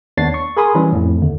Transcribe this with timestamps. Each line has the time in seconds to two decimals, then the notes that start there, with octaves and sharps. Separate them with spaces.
0.17 D#2 B3 D4 C#5 A6 C7
0.34 C#6
0.57 G#4 A#4 G#5 B5 C6 D#6
0.75 E3 G3 C#4
0.92 F2 A2
1.21 D#2 D3